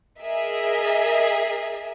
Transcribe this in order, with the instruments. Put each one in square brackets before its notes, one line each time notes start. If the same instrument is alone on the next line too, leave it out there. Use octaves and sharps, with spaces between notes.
[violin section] G#4 A#4 D#5 E5